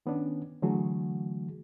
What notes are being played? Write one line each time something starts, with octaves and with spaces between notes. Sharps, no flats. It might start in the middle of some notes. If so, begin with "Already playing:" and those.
D#3 B3 C#4 D4
D3 E3 F#3 A3 F#4 G#4